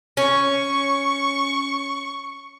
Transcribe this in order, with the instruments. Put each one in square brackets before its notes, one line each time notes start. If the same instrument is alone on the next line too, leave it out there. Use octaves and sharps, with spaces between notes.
[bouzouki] C#4 [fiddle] C#6